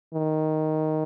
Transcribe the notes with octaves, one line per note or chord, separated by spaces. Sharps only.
D#3